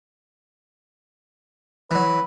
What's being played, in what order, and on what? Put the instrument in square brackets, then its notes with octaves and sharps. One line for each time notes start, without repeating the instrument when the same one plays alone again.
[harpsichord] E3 F#3 [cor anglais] B4